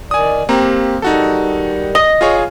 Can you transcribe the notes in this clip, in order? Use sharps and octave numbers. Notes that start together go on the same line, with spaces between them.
D#3 D5 G#5 D#6
A#3 C4 G4 A#5
D#3 G3 D#4 F#4 A4
D#5
F4 G#4 C#5